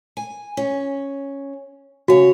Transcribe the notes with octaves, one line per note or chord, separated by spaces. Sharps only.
G#5
C#4
C#3 F#4 C#5